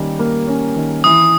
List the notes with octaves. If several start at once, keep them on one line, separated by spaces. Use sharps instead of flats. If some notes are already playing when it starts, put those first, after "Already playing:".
Already playing: D#3 G3 A#3 C#4
A#3
C#4
D#3
E3 D#6